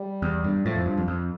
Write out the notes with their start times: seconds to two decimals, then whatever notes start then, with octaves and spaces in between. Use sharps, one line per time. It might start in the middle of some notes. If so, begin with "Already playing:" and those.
Already playing: G3
0.22 E2
0.44 G2
0.65 A2 F3
0.76 F2
0.86 G2
0.98 F2
1.08 F2